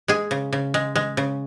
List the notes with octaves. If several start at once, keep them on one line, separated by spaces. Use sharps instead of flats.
G#3 G#4
C#3
C#3
G#3
G#3
C#3